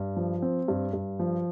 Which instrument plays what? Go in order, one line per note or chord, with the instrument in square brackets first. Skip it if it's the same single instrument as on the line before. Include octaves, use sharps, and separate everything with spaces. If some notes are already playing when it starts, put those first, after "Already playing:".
Already playing: [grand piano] G2
F3
C4
G2
G2
F3